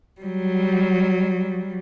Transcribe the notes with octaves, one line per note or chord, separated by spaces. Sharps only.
F#3 G3